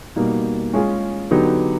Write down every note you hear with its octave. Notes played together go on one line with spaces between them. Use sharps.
B2 G3 A#3 D#4
G#3 C#4 F4 G#4
D3 F#3 B3 D#4 G4